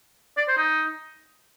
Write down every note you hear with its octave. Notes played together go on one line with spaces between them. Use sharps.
D5
C5
D#4